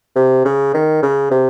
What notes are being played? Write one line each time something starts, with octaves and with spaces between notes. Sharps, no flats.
C3
C#3
D#3
C#3
C3